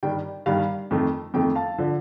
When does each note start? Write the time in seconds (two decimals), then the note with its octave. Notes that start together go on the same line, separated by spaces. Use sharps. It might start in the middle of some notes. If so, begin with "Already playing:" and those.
0.03 G2 D#3 G3 G5
0.46 G2 D#3 G3 F5
0.91 F2 D#3 A3
1.34 F2 D#3 A3 G5
1.55 F5 A5
1.78 D3 F3